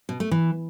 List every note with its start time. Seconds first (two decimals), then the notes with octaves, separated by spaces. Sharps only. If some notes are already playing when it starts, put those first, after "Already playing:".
0.09 B2
0.20 A3
0.31 E3